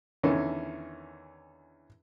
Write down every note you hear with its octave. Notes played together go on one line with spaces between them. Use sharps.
E2 D3 D#3 C#4